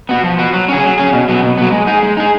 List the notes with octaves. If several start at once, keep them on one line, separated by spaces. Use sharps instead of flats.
B3 F#4
F3
B3 F#4
F#3
C#4 G#4
F#3
C#4 G#4
B2
F#3 B3
B2
F#3 B3
G#3
D#4 G#4
G#3
D#4 G#4